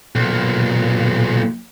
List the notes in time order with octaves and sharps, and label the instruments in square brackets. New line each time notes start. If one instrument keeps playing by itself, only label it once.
[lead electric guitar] B1 A#2